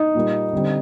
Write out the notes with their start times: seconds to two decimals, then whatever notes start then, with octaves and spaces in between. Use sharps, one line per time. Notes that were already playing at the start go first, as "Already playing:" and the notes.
Already playing: D#4
0.15 A#2 G3 A#3
0.53 D3 G3 C4